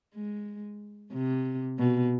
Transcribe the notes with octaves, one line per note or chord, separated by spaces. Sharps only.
G#3
C3
B2